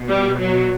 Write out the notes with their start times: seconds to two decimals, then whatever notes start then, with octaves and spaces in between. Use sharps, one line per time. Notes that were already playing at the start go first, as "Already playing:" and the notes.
Already playing: B2
0.09 G3
0.39 F#3